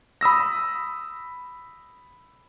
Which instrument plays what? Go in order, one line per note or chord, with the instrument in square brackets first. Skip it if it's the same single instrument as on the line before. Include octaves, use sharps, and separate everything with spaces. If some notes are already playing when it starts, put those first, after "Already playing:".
[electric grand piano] B5 D#6 E6 A#6